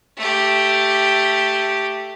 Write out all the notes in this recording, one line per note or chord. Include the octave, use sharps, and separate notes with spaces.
A3 G4